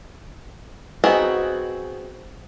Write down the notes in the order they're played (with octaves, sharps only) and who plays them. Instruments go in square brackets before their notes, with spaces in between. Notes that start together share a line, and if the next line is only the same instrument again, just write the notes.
[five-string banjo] B3 C4 D#4 F#4 G#4